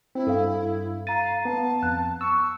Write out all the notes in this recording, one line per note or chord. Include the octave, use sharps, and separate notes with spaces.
C4 E4
G2 A4 F5
F5 A#5 A6 D#7
B3 A5
F2 F#6
C#6 E6